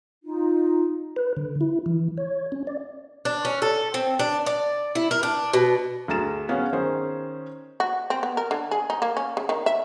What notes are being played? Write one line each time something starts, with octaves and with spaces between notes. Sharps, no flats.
D#4 F4
B4
D3
E4
E3
C#5
C#4
D5
D4
C#4
A4
C4
D4
D5
E4
A#4
D4
B2
D2 G#4 A#5 A6 E7
B3 C#4 G#4 F5
D#3 C#4 G#4 C5
F#4
C4
B3
A#4
D3
G#4
D#4
A#3
C#4
C#3
D#3
E5